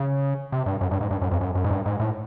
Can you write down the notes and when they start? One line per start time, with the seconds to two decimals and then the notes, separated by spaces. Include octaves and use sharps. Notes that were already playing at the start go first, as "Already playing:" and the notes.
Already playing: C#3
0.52 C3
0.66 G2
0.81 F#2
0.91 G2
1.01 G#2
1.11 G2
1.22 F#2
1.31 F2
1.41 F#2
1.55 F#2
1.64 G#2
1.71 G2
1.86 G#2
2.00 A2